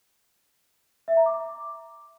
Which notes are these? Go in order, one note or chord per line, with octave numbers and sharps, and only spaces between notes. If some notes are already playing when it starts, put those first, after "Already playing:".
E5
A#5
D6